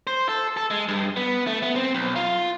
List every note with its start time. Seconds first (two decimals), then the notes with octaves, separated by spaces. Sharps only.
0.07 C5
0.29 A4
0.57 A4
0.71 G#3
0.88 G2
1.17 B3
1.47 A3
1.63 B3
1.76 C4
1.95 B1
2.16 F4